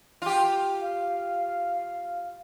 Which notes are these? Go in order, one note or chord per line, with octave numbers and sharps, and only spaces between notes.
F4 G4
F5